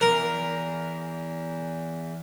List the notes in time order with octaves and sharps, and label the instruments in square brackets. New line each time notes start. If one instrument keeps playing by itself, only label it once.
[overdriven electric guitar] E2 [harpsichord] A#4